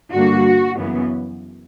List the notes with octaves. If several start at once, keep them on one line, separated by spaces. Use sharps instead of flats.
G2 D3 A#3 F#4
F#2 C#3 E3 B3